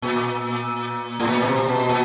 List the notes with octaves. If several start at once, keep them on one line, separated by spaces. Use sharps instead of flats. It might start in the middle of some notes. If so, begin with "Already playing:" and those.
A#2
A2
A#2
B2
C3
B2
A#2